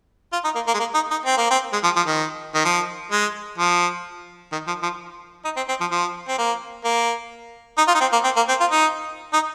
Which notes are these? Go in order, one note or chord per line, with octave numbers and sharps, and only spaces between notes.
F4
D#4
A#3
A#3
G#3
A#3
D#4
D#4
C4
A#3
C4
G#3
F3
F3
D#3
D#3
F3
G#3
F3
D#3
F3
F3
D#4
C4
C4
F3
F3
C4
A#3
A#3
D#4
F4
D#4
C4
A#3
C4
A#3
C4
F4
D#4
D#4